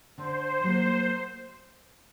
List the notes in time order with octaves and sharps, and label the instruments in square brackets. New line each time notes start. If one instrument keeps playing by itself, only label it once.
[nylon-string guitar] D3 [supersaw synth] C5
[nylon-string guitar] F#3 A#3